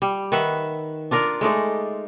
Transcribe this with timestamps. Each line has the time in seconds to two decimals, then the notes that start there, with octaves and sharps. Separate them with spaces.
0.02 G3
0.32 D#3 B4 E5 F#5
1.11 D4 F4 A#4 D5
1.41 G#3 A3 D#4 D5